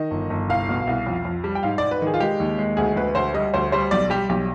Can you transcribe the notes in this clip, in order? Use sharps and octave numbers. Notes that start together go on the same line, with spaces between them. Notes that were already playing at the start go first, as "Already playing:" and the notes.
Already playing: D#3 D#5
G1
G1
C2 F5
B2
C2
F2
F2
G3
G5
G#2 F5
G#2 D5
B4
D#3
G#4
F4
G#3 G4
D#2
G#3
D2 G#4
D2 B4
D2 C5
G3 D#5
D2 C5
G3 C5
B1 D5
G3 G4
B1 G4